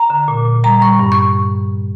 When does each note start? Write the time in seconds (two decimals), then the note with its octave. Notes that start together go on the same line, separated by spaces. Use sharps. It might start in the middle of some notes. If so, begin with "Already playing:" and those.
Already playing: A#5
0.10 D3
0.28 A#2
0.46 A#2
0.64 G3 A#5
0.82 G3 C#6
0.99 G2
1.12 C#6